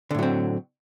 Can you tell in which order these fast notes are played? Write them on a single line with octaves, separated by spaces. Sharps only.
D3 A2 F#3 C4